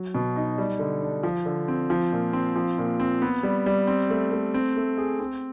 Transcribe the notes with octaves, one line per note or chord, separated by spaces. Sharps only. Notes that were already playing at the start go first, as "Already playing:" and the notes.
Already playing: F#3
B2
D#4
G3
D3
D4
F3
D3
C4
F3
A#2
C4
F3
A#2
C4
B3
G3
G3
C4
A3
A3
C4
A3
G#4
C4